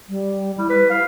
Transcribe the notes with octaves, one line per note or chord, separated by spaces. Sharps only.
G3
G3 E4
B4
F5